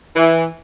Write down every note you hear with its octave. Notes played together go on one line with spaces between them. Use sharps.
E3